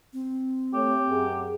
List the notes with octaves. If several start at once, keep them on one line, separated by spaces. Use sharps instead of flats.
C4
A3 G4 C#5
F#2 G#4